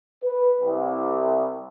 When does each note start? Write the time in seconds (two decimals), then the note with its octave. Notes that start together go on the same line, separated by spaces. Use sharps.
0.24 B4
0.61 C2